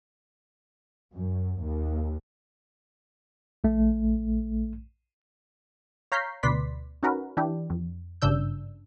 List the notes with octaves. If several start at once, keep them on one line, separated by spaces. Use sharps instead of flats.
F#2
D#2
A#1 A3
C#5 F5 A#5 G6 B6 C7
D2 B2 B4 D5 C6 B6
C#4 D#4 F#4 A#4 B4
E3 D4 E4 G4
F2
G#1 G2 C#3 D4 E6 G6